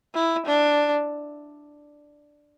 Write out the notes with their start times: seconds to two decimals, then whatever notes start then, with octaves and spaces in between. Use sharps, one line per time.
0.14 E4
0.46 D4